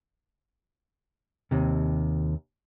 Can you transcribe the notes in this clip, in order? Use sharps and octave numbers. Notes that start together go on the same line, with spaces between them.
D#2 C3